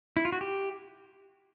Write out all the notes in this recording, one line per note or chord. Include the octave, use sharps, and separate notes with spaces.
E4
F4
F#4
G4